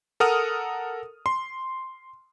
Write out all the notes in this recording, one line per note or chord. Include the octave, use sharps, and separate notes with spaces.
A4 A#4 F#5 D#6 F6
C6